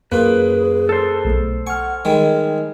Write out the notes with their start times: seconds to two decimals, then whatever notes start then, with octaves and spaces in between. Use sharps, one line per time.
0.12 F#2 A#3 F4 G#4 B4
0.89 A4 C5
1.25 B1 A3
1.67 F#5 G#5 C#6 F6
2.05 D#3 G3 G#3 D#4